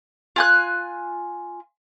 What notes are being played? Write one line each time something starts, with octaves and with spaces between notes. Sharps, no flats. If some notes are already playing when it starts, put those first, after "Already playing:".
F4 G#5 F#6